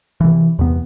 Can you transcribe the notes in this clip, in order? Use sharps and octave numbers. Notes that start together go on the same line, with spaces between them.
C3 E3
E2 C3 B3